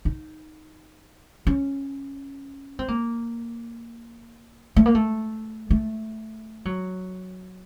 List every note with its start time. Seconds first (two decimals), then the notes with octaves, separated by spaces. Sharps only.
0.05 D#4
1.47 C#4
2.79 C4
2.88 A#3
4.76 A3
4.86 A#3
4.95 A3
5.71 A3
6.65 F#3